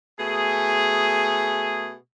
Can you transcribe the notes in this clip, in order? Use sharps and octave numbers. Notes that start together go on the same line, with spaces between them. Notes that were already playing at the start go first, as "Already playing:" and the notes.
B2 A3 G#4